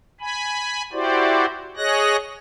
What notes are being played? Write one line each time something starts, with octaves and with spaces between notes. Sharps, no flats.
G#5 B5
E4 F#4 G4 C5 D5
G#4 C#5 D#5 F#6 A#6